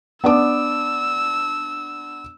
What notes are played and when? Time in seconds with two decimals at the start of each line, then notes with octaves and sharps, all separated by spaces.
0.24 B3 D4 D6 E6